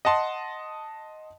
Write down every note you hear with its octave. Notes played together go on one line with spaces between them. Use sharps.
D#5 F#5 A5 C6